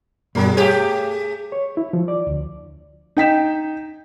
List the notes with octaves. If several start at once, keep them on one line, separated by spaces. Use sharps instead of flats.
G2 B2 F#3 G#3 A#4
A3 G4 G#4 C#5 G5
C#5
E4
F3
D5
D2
D#4 G5 B6 E7